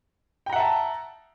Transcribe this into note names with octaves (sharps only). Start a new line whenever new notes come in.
E5 F#5 G5 A5 A#5